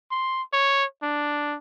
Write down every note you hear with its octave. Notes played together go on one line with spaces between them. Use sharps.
C6
C#5
D4